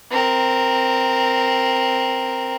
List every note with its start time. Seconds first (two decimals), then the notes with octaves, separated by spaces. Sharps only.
0.11 C4 A#4